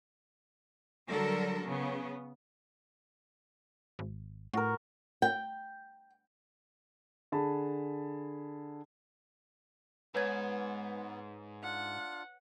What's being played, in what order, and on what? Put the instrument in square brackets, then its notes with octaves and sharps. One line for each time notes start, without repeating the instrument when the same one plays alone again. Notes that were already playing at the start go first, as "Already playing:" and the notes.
[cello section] D3 F#3 G3 A4 A#4
C#3 B3
[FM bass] G#1
[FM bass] A2 [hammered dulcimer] F#4 A#4
[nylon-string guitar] G5
[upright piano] D3 G#4 A5 B5
[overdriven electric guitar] G#2 [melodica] B3 [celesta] B4 C#5 G#6
[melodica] D4 F4 [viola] F#5